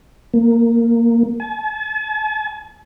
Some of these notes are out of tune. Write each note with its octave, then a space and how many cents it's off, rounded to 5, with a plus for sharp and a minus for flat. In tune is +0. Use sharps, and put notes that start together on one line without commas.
A#3 -5
A5 -45